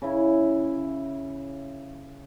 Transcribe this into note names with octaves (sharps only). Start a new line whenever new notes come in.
C#3 E4